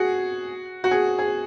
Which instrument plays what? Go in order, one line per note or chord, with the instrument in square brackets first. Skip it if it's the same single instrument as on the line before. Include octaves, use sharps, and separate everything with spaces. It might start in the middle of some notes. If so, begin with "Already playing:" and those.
Already playing: [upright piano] F#4 G#4
F#4
G#4
G#4